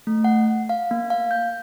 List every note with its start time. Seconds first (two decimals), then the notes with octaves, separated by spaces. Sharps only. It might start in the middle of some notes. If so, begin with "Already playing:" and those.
0.07 A3
0.24 F#5
0.69 F5
0.91 A#3
1.10 F5
1.31 G6